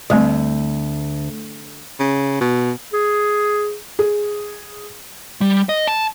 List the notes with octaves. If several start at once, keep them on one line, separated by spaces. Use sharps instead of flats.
D2 G3 A3 C4
C#3
B2
G#4
G#4
G3
D#5
A5